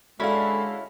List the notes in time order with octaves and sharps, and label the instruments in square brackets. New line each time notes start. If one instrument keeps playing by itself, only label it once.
[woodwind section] D3 [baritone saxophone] G#3 [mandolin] C#4 E4 B5 [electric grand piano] F#4 A4 F5